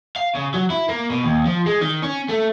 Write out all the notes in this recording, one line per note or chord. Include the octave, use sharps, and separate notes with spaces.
F5
C#3
F#3
E4
A#3
B2
D#2
F3
G#3
D#3
C#4
A3